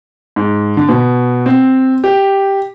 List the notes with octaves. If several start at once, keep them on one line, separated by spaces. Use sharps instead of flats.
G#2
D3
B2
C4
G4